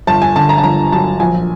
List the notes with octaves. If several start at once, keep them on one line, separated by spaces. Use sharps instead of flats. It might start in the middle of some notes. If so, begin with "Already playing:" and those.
G1 A5
G#5
D3 A5
A#5
A5
G1 A#5
F#3 A5
A#1 G#5